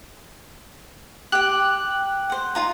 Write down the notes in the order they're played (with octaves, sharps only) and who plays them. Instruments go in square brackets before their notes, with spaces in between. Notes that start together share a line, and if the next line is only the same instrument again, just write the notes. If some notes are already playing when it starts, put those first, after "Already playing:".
[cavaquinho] G4 G5 [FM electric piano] F#6
[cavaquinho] C5 F#5
D#4 F4 A#5